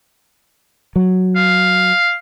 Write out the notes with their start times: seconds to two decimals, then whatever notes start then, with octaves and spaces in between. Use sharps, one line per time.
0.96 F#3
1.36 F5